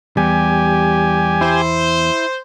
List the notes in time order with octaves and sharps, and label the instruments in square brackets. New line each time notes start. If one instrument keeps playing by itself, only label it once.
[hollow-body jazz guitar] E2 [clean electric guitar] G3 [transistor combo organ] G4 G#5
[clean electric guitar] E4 [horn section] C5